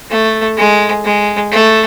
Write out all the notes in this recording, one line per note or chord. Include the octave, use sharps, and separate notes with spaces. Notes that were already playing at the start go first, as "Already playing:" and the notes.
A3
G#3
G#3
A3